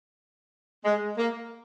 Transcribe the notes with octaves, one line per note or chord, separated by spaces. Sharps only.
G#3
A#3